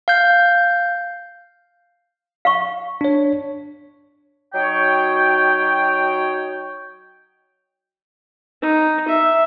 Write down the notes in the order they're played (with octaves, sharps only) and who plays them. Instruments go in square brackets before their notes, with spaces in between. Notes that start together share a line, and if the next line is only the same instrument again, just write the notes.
[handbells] F5 G6
[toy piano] F5 C#6
[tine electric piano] D4 C#5
[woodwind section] F#3 D#4 F#4 C#5 G5
[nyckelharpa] D#4
E5